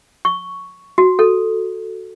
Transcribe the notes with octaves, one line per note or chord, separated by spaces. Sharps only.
C#6
F#4
A4